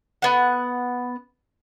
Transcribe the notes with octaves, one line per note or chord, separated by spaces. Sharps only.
B3 F#5